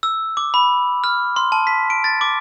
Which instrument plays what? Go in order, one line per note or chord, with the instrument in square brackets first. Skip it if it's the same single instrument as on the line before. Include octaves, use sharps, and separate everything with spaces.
[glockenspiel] E6
D6
B5
F6
C6
A5
B6
D7
A6
D6